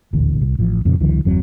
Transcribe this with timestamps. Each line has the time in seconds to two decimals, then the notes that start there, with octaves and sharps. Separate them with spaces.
0.13 D#1 A1 D2 A2
0.41 C2
0.59 A1 F3
0.85 F2 A#2 C#3
1.00 C#2 D3 E3 F#3
1.25 G1 E2 F#3 C4